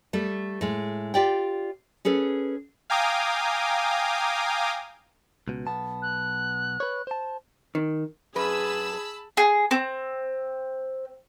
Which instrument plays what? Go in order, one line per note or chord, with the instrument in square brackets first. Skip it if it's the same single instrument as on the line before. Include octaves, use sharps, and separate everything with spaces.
[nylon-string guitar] G3 A3
A2 G#3
F4 G4 D5 G5
C#4 G#4 A4 B4
[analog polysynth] F5 G5 G#5 A#5 D6 D#6
[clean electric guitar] C#2 B2
B1 B3 A5
[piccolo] F#6
[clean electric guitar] B4 C#5
C5 A5
[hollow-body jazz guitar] D#3
[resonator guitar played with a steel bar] F#2 B4 [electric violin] G#4 [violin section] A5 B5 E6
[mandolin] G#4
C4